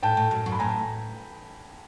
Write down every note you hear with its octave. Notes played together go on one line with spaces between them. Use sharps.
A2 G5 A5
A2
F#2
F#2
B5
A2 G#5 A#5